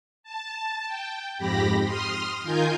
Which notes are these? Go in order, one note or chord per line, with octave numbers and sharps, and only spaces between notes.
A5
G5
F2 G#2 G4 B5 A#6
C6 D#6 F6
D#3 F4 A#4 G#5 G6